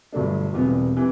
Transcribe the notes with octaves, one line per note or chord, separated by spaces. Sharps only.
G1 G2 F#3 A3 D4
E1 E2 C3 G3 B3
C3 E3